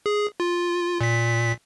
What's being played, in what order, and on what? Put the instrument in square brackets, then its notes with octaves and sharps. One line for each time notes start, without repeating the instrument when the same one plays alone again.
[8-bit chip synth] G#4
F4
A#2 B6